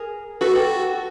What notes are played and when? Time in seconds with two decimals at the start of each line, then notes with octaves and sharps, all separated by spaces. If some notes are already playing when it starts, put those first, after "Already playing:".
Already playing: G#4 A#4
0.41 F#4 A4 B4
0.55 G4 A4